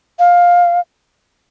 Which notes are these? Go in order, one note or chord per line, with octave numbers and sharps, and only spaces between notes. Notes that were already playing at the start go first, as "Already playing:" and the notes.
F5